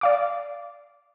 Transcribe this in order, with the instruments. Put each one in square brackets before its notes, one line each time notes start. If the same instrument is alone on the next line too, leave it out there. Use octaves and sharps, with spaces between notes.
[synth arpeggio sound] D5 F5 D6